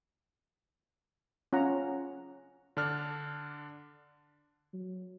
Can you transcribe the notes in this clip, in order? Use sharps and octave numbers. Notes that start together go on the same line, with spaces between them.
C#4 F4 F#5 A#5
D3 D4 F6
F#3